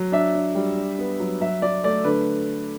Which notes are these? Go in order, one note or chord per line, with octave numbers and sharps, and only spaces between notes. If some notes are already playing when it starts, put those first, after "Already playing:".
Already playing: F#3
D4 E5
D4
G3
D4
B3
F#3
F#3 E5
F#3 D5
A3 D5
D3 B4